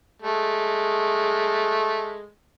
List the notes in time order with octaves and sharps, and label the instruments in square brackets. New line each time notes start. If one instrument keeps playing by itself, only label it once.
[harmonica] G#3 A3